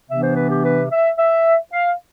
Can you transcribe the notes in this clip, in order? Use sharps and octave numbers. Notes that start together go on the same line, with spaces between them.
C3 E3 B3 D4 E5
C5
B4
G4
B4
E5
E5
F5